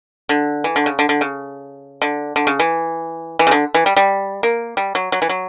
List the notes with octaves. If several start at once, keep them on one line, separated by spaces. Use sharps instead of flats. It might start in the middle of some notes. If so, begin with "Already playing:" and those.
D3
E3
D3
C#3
D3
D3
C#3
D3
D3
C#3
E3
E3
C#3
D3
E3
G3
G3
A#3
G3
F#3
F#3
E3
F#3